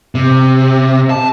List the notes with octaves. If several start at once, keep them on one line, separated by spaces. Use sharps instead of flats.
C3
A5